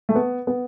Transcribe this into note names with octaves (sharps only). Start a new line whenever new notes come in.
A3
B3
B3